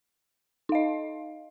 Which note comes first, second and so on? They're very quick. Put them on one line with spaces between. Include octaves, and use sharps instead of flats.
D#4 F5 D#5